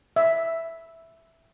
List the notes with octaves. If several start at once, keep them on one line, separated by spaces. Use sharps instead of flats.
E5